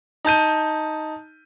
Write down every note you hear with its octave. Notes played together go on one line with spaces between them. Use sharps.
D#4 A5 G6 D#7